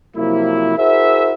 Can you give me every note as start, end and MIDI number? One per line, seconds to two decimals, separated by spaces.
0.17 0.75 48
0.17 0.75 53
0.17 0.75 54
0.17 0.75 58
0.17 0.75 64
0.77 1.32 64
0.77 1.32 66
0.77 1.32 68
0.77 1.32 70
0.77 1.32 72
0.77 1.32 76